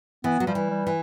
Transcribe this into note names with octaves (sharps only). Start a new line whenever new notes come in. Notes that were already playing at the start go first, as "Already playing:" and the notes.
E3 B3
F#3
F3 G3
E3
G3
E3